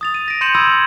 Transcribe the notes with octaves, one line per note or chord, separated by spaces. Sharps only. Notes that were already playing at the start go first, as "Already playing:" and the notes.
D#6 A6 F7
D#7
A#6 D7
C6 G6 C#7 D#7 E7 F#7
B5 C6 D#6 E6 G#6 A6
G#6